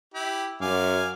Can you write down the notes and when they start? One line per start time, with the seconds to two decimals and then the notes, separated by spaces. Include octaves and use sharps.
0.14 E4 G4
0.61 F#2 F5 G#5 D6